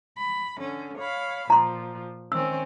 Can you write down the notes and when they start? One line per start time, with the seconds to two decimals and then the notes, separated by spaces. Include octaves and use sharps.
0.18 B5
0.60 D3 C#4
0.98 C#5 F5 B5
1.50 A#2 F3 A#5 C6
2.32 D#3 C4 C#4 E6